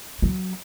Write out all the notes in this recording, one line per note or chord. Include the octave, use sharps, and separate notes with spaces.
F#3